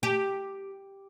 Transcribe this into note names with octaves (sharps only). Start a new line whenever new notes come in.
G4